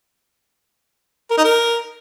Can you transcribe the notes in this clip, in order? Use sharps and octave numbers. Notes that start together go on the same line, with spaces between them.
A#4
D#4
A#4